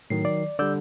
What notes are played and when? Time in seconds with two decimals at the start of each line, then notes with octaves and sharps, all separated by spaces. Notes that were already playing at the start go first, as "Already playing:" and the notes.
0.10 A2 D#3 F#3 C7
0.25 D5
0.59 D3 G3 D5 E6 G6